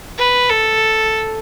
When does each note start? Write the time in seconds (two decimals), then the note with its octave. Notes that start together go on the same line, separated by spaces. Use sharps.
0.18 B4
0.49 A4